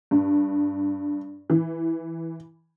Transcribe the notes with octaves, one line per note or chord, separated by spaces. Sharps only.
G2
E3